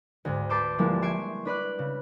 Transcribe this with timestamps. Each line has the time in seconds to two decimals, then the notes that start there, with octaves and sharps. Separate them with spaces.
0.25 D2 G#2
0.49 B4 A5 C6 D6 E6 G6
0.78 D3 F3 G3 G#3 A#3 E4
1.02 E5 C6 C#6 G#6 D7
1.45 D4 B4 D5 F#6
1.79 C#3